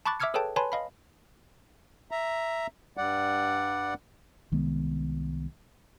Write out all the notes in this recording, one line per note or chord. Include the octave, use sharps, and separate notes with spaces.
A5 B5 C#6 D6 F#6 A6
E5 D6 E6 F6 G#6 C#7
G#4 A4 B4 C#5 G5 A5
B4 C#5 G#5 A5 B5 C6
D#5 F5 B5
E5 A#5
G2 G3 D5 F#5
C2 D#3 G#3 B3